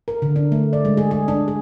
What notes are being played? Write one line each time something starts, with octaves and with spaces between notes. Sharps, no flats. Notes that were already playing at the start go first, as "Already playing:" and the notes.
A#4
D3
D4
A3
D5
G#3
G#4
G#4
D4
G#4